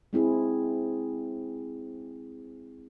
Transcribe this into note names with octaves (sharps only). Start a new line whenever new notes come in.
G#3 C4 E4 G#4